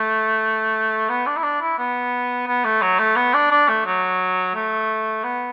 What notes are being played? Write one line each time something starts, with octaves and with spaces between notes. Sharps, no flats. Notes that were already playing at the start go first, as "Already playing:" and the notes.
Already playing: A3
B3
D4
E4
D4
E4
B3
B3
A3
F#3
A3
B3
D4
D4
A3
F#3
A3
B3